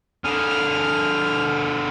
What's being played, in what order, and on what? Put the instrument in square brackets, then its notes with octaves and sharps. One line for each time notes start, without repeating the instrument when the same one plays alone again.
[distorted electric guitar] D3 G#4 [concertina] F6